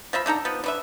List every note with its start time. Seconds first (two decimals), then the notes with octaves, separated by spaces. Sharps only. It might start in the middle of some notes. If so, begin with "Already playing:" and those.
0.13 F3 D#5 E5 B5
0.26 D3 D#4 A4 A#5
0.45 F3 B3
0.64 D3 B4 E5